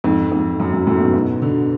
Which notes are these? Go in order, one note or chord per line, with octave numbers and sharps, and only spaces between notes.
F2 G#2
F2 G#2
F#2
F#2
F#2 A2
G#2 B2
G#2 B2
B2 D3